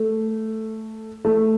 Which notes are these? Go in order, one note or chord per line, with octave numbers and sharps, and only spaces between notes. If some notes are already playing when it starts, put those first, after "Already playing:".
Already playing: A3
A3